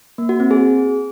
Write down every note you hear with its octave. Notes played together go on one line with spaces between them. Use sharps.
A#3
F#4
C4
G#4